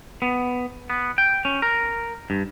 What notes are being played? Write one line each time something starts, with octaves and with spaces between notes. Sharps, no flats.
B3
B3
G5
C#4
A#4
G2